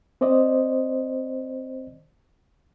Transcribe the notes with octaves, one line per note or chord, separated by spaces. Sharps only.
C4 C5 D5 D#5